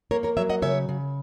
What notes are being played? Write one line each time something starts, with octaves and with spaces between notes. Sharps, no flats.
A#3 A#4 C#5
A#4 C#5
F#3 C#5 E5
D#5 F#5
C#3 C#5 E5
C#3